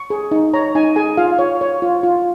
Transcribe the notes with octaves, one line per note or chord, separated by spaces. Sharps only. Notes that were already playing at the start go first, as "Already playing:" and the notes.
Already playing: C#6
G#4
D#4
C#5 A#5
D#4 G#5
G#4 G#5
F4 F5
C#5
C#5
F4
F4